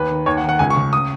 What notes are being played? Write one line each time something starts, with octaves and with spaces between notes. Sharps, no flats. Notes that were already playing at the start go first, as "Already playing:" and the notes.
Already playing: D#2 B4
D#3
D#2 C#5
F#5
D#3
F#5
C#2 G#5
C#6
C#3
D#6